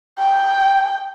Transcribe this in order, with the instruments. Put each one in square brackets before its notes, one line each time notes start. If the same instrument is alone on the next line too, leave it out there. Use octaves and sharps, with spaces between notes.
[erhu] G5